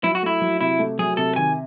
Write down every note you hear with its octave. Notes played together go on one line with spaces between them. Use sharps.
F#3 E4
F#4
A3 E4
F#3
C3 E4
A3
F#3 G#4
C3 A4
D#3 G#5